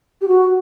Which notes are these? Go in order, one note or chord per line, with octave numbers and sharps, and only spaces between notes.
G4
F#4